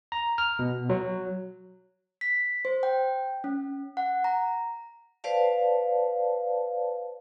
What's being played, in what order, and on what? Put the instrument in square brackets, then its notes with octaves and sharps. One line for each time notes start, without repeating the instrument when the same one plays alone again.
[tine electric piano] A#5
F6
B2
F#3
[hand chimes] B6
C5
G5
C#4
F#5
A#5
[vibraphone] B4 C5 D5 F5 A5